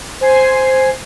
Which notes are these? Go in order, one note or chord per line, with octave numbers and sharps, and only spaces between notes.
C5 G#5 C7